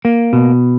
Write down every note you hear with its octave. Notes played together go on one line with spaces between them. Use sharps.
A#3
B2